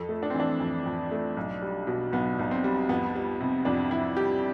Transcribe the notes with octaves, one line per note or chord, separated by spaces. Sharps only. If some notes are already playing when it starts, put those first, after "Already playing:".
Already playing: F2 A4
A3
D4
C4
E3 D4
F2
F2
A3
B1
G3
B2
B1 B3
B1
C4
G3
F2 B3
G3
C3
F2 D4
F2 E4
G3 G4